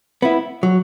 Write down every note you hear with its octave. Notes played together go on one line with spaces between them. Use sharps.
B3 E4
F#3